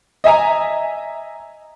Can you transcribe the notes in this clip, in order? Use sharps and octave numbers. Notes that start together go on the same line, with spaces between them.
D#5 E5 G#5 A#5